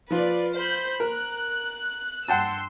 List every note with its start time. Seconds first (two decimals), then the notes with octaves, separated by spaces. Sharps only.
0.10 F3 F4 B4 D5
0.55 C5 B5 G6
1.00 A#4 F#6
2.28 G2 F#5 G5 A5 C6 E6